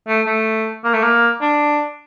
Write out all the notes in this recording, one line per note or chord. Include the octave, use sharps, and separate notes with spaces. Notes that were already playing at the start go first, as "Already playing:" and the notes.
A3
A3
A#3
A3
A#3
D4